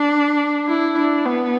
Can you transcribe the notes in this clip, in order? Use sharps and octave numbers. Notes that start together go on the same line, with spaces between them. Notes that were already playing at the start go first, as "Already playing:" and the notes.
Already playing: D4
E4
D4
B3